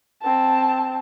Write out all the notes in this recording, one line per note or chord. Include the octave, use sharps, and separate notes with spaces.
C4 A5